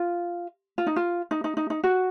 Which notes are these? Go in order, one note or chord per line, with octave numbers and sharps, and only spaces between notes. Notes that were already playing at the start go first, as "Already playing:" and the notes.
Already playing: F4
F4
D#4
F4
D#4
D#4
D#4
D#4
F#4